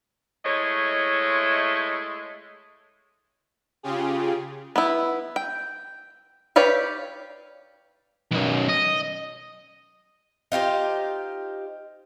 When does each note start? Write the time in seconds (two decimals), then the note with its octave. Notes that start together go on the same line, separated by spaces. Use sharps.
0.45 G#3 A3 E4 C#5 D#5
3.83 C#3 F4 G4 G#4
4.76 B3 E4
5.36 G5
6.56 G4 B4 C#5 D5 F5
8.32 B1 F#2
8.69 D#5
10.52 D#4 F4 G4 C5